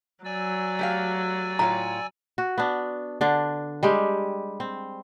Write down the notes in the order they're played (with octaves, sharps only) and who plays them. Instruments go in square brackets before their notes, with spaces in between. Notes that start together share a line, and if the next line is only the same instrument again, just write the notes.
[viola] F#3 [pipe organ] D5 G#5 E6
[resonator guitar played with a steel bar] A3 G4 F5
[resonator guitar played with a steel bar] A2 F4 C#5 [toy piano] A#5
[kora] F#4
B3 D4
D3 D4
G3 G#3 G4
C4